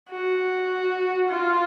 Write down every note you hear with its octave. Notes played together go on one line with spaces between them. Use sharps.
F#4
F4